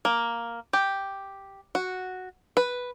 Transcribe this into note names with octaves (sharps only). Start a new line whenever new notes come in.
A#3
G4
F#4
B4